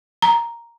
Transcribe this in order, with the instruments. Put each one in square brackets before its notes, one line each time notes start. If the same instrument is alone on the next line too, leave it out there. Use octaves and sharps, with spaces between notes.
[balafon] A#5